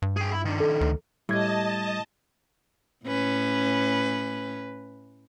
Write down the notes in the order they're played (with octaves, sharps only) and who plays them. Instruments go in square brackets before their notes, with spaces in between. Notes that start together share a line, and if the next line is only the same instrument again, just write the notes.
[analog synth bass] G2
[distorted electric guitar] G#4 G5
E4
D#3 D4
[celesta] A4
[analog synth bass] D2
[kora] A2 G4 [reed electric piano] G3 G#6 [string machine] D#5 A5
[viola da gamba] A2 C#4 B4